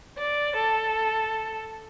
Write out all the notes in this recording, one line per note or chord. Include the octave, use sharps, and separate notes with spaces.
D5
A4